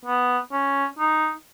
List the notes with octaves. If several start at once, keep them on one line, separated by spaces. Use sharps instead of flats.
B3
C#4
D#4